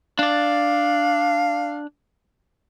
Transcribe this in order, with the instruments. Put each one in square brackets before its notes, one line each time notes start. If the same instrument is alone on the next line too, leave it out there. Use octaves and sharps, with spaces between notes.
[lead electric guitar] D4 D5 [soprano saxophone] F5